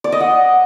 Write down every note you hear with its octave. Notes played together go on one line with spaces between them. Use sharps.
D5
D#5
F#5